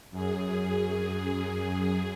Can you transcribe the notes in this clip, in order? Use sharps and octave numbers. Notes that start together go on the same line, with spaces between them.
F#2 G#4